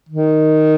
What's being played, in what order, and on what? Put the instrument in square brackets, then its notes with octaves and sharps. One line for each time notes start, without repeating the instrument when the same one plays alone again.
[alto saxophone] D#3